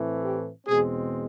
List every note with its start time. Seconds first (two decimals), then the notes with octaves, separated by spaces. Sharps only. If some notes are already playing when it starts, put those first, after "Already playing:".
Already playing: A2 E3 A3 C4
0.23 G4
0.67 E2 B2 G#3 C4 G#4